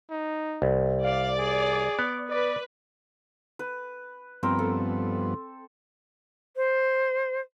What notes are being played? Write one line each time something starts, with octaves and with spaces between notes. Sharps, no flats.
D#4
C2
D5 F5
G#4
B3
B4 D5
B4
G2 F3 B3 C4 A#4
A4
C5